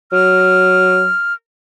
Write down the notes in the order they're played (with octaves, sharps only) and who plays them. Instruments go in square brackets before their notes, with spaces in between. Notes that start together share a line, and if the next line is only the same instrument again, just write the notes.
[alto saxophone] F#3 [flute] F6